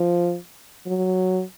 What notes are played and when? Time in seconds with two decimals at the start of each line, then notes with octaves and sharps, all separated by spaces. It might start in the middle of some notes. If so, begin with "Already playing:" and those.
Already playing: F3
0.87 F#3